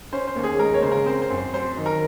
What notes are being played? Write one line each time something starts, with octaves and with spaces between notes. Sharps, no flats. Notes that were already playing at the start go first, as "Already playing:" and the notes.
C#4 C5
C5
D#2
G#4
G#3 A#4
C#5
C#3 C5
A#4
C4 C5
C5
F#2
C5
F#3 C5
D#3
A#4